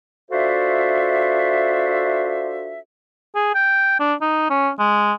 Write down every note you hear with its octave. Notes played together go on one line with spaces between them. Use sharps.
D4 F4 F#4 A4 C5 E5
G#4
G5
D4
D#4
C#4
G#3